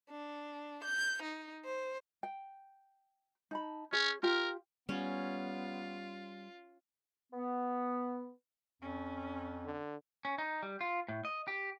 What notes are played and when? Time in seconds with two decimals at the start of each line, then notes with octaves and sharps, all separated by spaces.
0.10 D4
0.84 G6
1.23 D#4
1.65 C5
2.23 G5
3.51 D#4 A5 B5
3.93 C#4 G#4 C#5
4.23 F4 G4 A#4 G5
4.89 G3 B3 C#4 F4
7.31 B3
8.82 F2 C#4
9.65 D3
10.25 C#4
10.38 D#4
10.63 G3
10.81 F4
11.08 A2
11.25 D#5
11.48 G4